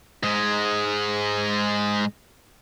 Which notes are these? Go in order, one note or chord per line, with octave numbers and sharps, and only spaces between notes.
G#2 G#3